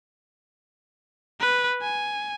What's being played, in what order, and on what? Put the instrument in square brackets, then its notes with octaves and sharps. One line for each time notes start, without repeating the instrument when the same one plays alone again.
[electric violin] B4
G#5